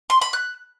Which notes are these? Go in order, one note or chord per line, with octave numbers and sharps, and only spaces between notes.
C6
B5
F#6